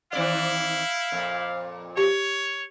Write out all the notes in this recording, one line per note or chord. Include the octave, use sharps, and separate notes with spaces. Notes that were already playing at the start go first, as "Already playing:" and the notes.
D#3 C4 E4 D5 F5
F2 A#2
G4 C#5